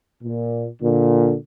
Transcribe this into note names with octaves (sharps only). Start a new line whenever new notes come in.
A#2
A#2 D3